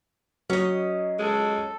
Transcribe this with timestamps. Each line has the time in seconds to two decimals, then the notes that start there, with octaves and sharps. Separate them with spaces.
0.50 F#3 C#4 D#5
1.19 G#3 A4